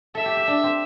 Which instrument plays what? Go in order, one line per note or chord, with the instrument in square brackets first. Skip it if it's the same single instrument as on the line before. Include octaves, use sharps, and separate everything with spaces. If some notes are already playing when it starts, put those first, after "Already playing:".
[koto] A4 [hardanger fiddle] E5
[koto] G4
G4
D4
C4